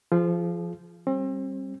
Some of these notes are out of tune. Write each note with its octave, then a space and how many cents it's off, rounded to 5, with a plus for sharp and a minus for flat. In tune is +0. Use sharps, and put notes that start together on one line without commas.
F3 -15 F4 -15 G#4 +30
G3 +0 C4 +35